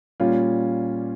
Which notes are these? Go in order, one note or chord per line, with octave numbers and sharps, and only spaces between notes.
A#2 G3 C#4 F4